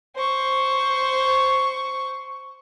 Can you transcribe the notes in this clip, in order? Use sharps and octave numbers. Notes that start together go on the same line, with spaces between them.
C5 C#6